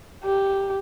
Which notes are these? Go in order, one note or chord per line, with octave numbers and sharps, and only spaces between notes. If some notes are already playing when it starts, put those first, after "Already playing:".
G4